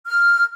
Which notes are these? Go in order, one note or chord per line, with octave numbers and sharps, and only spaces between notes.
F6